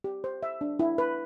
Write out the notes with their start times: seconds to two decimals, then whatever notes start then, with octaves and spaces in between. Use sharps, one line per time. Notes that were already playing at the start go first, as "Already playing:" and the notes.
0.04 G4
0.24 C5
0.43 E5
0.61 D4
0.79 E4
0.98 B4